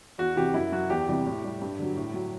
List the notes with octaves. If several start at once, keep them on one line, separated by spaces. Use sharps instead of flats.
E2 F#4
C3 E3 G4
F#2 E4
F#3 F#4
E2 G4
C3 E3 G3
A2
G3
G2
D3 F#3
A2
F#3